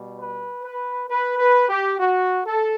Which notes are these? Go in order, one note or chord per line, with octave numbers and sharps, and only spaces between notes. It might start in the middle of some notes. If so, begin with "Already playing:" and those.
Already playing: B2 G3
B4
B4
B4
B4
G4
F#4
A4